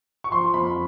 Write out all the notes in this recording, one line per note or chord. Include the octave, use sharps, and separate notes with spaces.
C#6
F3 C6
F2 B5